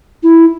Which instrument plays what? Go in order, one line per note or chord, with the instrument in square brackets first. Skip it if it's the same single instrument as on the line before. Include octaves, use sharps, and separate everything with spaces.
[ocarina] E4